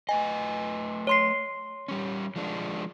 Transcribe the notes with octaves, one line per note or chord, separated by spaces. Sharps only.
A3 B4 D#5 G#5
C#5 C6 C7
G3 C#4
F3 G#3 D4